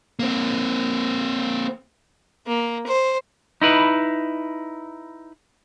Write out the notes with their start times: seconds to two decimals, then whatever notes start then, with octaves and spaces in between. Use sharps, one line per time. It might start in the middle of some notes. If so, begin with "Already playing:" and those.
0.19 A#3 C4
2.47 A#3
2.87 C5
3.62 D#4 E4 B4